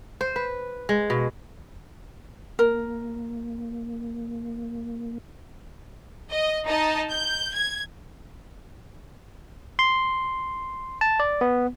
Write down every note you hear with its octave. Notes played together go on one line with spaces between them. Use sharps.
C5
B4
G#3
B2
A#3 A#4
D#5
D#4 D#5 A5
G6
G#6
C6
A5
D5
B3